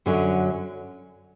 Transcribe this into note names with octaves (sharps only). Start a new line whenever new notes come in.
F#2 D3 F#3 C#4